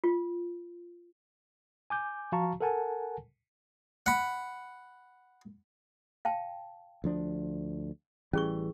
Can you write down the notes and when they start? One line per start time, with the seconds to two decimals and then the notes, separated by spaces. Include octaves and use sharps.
0.04 F4
1.90 G#5 D6 G6
2.32 F3 F#4 F5 A5 A#5 C#6
2.61 A4 A#4 F#5 G#5 A5
4.06 F#5 B5
6.25 F5 G5 A5
7.04 D2 F3 D4
8.33 A1 E3 G3 C#4 G#4 C#6